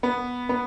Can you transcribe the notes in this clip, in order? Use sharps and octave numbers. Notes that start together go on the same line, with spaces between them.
B3
B3